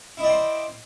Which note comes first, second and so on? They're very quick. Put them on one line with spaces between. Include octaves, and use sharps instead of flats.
E4 D#5 D5 G5 C5